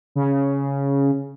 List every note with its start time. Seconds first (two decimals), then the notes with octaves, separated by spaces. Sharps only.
0.15 C#3